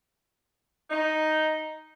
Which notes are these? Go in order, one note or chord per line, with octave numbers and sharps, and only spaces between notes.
D#4